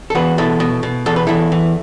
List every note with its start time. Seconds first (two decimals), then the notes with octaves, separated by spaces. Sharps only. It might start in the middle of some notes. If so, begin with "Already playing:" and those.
0.10 A4
0.15 E2 F#4 B4
0.38 B2 E4 A4
0.60 B2
0.83 B2
1.06 E2 A4
1.16 B4
1.27 E2 E4 A4
1.52 E3